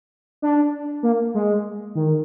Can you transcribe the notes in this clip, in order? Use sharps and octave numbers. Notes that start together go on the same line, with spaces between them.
D4
A#3
G#3
D#3